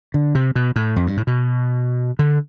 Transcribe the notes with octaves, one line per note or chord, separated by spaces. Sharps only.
D3
C3
B2
A2
F2
G2
A2
B2
D3